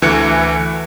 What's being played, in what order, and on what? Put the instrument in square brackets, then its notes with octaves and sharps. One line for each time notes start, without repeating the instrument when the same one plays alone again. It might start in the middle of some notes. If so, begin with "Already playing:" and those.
[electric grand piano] D2 E3 A3 F#6 C#7